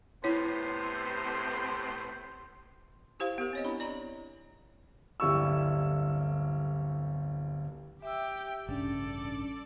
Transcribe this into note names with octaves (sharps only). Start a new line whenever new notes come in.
A2 C3 B3 E4 C5 C#5
E4 G4 C5 F5
B3 G4 A#4
C4 C#5 D#5
D4 E4 B5
D5 A#5
D1 G1 G3 E4 C#6 E6
G4 E5 G5 E6
A1 G2 C#3 C#4 D4 A4 D5